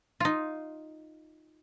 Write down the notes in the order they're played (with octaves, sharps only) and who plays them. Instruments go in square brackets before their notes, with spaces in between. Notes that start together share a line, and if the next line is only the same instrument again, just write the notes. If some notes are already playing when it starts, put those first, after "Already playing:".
[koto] D#4 F4